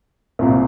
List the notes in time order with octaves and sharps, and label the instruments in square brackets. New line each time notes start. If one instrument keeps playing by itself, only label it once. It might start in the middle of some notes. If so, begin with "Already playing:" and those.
[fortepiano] C2 A#2